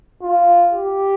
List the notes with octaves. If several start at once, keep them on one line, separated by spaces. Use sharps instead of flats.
F4
G4